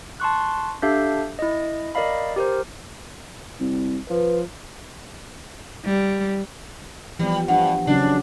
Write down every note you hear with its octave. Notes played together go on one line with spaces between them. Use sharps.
A5 C6 C#6 F#6
D4 G4 A4 E5 F5 G6
E4 D#5
A#4 D5 D#5 F5 B5
G4 A#4 C5
C2
F3 B4
G3
E3 F3 G3 B3
G2 F#5
C#3 F#3 C#4 D4